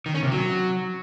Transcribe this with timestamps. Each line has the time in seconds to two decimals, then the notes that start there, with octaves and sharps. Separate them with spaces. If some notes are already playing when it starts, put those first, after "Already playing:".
0.06 D#3
0.14 C#4
0.23 C3
0.31 F#3